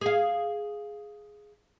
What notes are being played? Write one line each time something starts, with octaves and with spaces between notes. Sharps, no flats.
G#4 F5